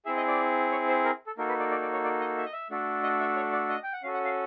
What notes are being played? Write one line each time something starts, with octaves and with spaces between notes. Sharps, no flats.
C4 E4 G#4 E5
D#5
D5
C#5
C5
A#4
A4
A#3 D#4 F#4 A4 A#4
B4
D5
D5
D5
C#5
D5
D#5
E5
D#5
E5
A3 D4 F#4 A4
D#5
E5
C#5
D5
D#5
G5
F#5
C#4 F#4 A4 F5
F#5
F5